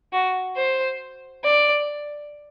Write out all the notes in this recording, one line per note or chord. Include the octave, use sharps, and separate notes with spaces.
F#4
C5
D5